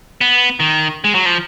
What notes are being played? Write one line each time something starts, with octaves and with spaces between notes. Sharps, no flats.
B3
D#3
G#3
F#3
F3